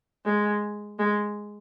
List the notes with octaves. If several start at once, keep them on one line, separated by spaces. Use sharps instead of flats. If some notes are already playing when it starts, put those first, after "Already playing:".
G#3
G#3